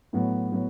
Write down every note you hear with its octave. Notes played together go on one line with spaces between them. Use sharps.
A2 F#3 B3
A2 F#3 B3